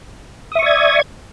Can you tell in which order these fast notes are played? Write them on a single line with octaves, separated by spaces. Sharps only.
D#6 E5 C#6 D5 G#6